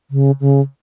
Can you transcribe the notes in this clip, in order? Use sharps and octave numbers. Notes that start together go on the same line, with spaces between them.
C#3
C#3